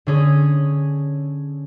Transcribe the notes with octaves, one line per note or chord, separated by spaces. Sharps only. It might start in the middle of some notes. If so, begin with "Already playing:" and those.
D3 C#4 G#4